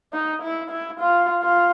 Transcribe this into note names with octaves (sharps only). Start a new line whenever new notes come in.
D#4
E4
E4
F4
F4